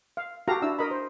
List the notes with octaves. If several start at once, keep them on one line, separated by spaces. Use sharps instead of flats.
F5
F#4 G4 A4 F5 A#5
D4 E4 E6
A#4 D#5 B5
C5